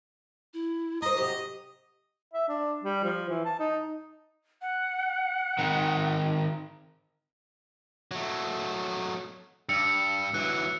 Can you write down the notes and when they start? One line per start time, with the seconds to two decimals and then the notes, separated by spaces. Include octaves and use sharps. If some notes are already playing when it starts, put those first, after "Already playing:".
0.54 E4
1.02 A#4 C5 D#5 D#6
1.17 C3 F#3 G4
2.33 E5
2.49 D4
2.83 G3
3.03 F3
3.29 E3
3.45 A5
3.59 D#4
4.62 F#5
5.59 D#3 C4
8.11 F#3 A3
9.69 G2 E6 C#7
10.34 E3 F#3 F#6